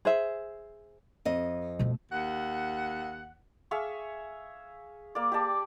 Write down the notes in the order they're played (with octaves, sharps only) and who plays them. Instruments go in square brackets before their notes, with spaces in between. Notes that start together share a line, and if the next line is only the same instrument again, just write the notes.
[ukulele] G#4 C5 E5
[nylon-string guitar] F2 D#5
[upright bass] B2 A3
[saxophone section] D#2 F#5
[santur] G#4 E5 F5 C#6
A#3 D5
G4 D5 A5